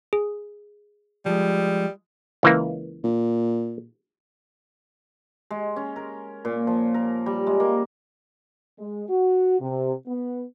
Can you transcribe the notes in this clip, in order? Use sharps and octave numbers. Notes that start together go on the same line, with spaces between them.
G#4
F3 G3 G#3
C#2 E3 A#3
A#2
G#3
C#4
A#4
A#2
F3
A#4
G3
G#3
A#3
G#3
F#4
C3
B3